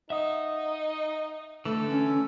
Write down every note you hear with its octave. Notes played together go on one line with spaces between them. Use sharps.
D#4 E5 F#5 D#6
D3 E3 A3 A4
C#4